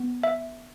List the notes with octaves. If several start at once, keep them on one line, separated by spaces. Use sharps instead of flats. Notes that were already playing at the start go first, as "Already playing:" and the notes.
Already playing: B3
E5